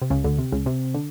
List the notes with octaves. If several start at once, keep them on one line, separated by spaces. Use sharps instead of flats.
C3
C#2 C#3
D2 D3
C3
C#2 C#3
C3
D3